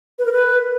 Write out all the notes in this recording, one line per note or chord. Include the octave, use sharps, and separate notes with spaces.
B4
A#4
B4